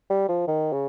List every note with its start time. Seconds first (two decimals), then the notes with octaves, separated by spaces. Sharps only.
0.10 G3
0.29 F3
0.47 D#3
0.72 C#3